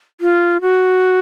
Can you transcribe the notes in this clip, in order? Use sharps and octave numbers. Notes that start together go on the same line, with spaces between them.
F4
F#4